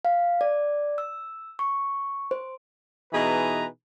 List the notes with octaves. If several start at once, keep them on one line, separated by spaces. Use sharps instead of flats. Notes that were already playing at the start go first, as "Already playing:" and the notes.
F5
D5
E6
C#6
C5
B2 E3 D#4 G#4 B4 A#5